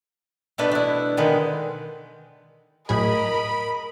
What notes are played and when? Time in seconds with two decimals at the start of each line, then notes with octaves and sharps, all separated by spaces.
0.58 B2 A3 D4 B4
0.71 D4 E4
1.17 B2 D3 D#3 G#3 B4
2.89 A2 F#3 G#4 A#4 D#5 B5